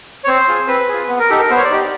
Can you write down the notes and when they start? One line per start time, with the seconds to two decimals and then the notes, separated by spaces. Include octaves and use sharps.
0.24 C#5
0.27 C4 C5
0.48 F4 G#4
0.68 C4 B4
0.89 F4 G#4
1.08 B3
1.20 A#4
1.30 D#4 G4 A4
1.40 A#4
1.50 B3 C5
1.56 C#5
1.64 D5
1.71 D#4 G4